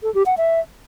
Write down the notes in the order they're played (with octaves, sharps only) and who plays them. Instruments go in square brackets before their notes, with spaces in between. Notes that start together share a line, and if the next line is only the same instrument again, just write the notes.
[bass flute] A4
G4
F#5
E5